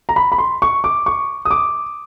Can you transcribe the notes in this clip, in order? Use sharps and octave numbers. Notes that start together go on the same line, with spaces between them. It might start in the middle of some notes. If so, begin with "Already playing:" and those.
A#5
B5
B5
C6
C#6
D6
C#6
D#6
D6